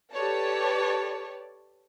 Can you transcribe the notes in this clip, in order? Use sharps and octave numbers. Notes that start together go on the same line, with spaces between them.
G4 A4 B4 C#5 D5 A5